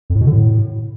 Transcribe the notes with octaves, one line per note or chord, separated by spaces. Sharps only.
F2
A2
B2
D3
A2